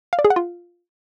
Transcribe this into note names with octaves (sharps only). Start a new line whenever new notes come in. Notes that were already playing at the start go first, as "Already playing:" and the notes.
F5
D5
G#4
F#5
F4